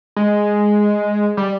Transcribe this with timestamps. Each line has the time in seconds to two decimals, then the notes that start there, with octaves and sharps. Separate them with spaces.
0.16 G#3
1.37 G3